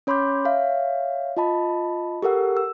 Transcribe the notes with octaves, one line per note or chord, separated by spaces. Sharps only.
C#4 C#5 B5 C6 D6 G6
C#5 E5 F5
F4 D#5 A5 B5
G4 A4 A#4 F#5 E6
E6